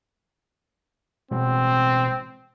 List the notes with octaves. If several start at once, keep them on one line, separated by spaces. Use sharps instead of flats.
A1 B2 G#3 C4